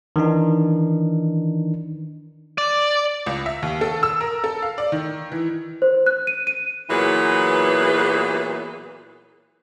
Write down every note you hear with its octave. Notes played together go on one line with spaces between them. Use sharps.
D#3 E3 D4 D#4
D5
C#2
E5
D#2
A4
E6
A#4
A4
F5
D5
D#3
E3
C5
F#6
D#7
D#7
A#2 E3 F#3 B3 G#4 B4